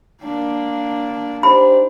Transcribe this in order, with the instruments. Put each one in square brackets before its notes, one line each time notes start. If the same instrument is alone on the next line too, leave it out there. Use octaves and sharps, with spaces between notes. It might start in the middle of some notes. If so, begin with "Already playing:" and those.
[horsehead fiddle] A#3 D4
[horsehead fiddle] D4 [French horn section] D#4 G4 C5 [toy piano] B5